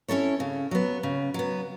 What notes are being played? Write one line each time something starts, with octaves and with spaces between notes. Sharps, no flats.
C#4 E4 A4 C#5
C#3
F#3 B3
C#3
F#3 B3